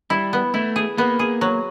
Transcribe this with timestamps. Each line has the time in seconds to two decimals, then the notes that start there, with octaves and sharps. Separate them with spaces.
0.10 G3 E4
0.33 B3
0.54 A3 E4
0.76 G#4
0.97 A#3 B3
1.19 G#4
1.41 F#3